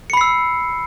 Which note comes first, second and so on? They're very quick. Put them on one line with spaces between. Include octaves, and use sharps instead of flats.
C#7 B5 C7 E6